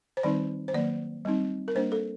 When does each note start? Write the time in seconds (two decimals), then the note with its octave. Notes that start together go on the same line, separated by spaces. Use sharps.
0.17 C5
0.23 D#3 G3 C4 D#4 D5
0.68 C5
0.73 D#3 F#3 A#3 D5
1.25 G3 C4 D#4
1.68 A#4
1.75 G3 A#3 D4 C5
1.92 A4